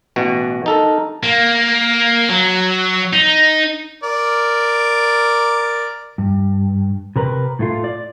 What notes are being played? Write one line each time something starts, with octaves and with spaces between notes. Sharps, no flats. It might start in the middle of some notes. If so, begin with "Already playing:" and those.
A1 B2 F#4
D#4 A4 A#4
A#3
F#3
D#4
A#4 D5
G2
C3 A#4 B4
A2 A3 F4
D5